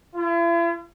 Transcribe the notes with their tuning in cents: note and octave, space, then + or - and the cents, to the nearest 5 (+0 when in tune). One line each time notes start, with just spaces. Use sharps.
E4 +45